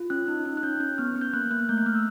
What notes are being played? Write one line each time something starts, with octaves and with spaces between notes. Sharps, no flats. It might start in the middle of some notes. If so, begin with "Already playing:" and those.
Already playing: F4
C#4 F#6
D#4
D#4
F#6
C#4 G6
C#4 G6
B3 F6
B3
G6
A#3 F#6
A#3 F#6
A3 G6
F#6
A3 F6
E6